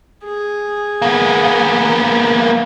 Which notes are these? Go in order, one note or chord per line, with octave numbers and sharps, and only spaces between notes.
G#4
A#3 B3